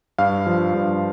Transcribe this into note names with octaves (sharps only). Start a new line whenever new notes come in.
G2 F5
F3
G2